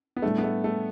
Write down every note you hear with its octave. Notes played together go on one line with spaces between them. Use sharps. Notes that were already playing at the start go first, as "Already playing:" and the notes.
B3
A2 G3 A3 D4
B3
A3
A3